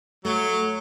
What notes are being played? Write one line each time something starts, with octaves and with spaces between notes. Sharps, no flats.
F#3 A3